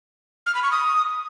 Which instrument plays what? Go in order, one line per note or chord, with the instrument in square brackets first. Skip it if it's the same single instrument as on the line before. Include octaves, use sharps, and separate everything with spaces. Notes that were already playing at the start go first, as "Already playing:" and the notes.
[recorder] F6
B5
C#6
D#6